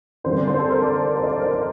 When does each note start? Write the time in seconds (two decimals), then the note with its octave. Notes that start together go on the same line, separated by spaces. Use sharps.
0.24 F2 D3 G3 C4 C5
0.37 D5
0.47 C5
0.59 A4
0.71 A#4
0.82 D5
1.05 D5
1.17 C5
1.23 D#5
1.29 D5
1.40 A#4
1.52 C5